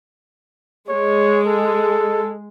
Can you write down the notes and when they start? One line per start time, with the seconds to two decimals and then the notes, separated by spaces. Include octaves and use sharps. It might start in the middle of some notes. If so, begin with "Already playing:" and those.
0.89 G#3 C#5
1.47 A4